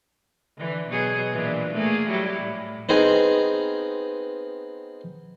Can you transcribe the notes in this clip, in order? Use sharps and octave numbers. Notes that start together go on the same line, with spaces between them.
D3 E3
B2 F#3 G#4
A#2 E3 D4
A3 A#3 G#4
F#3 G3 E4
A2
B3 C4 D#4 G#4 A#4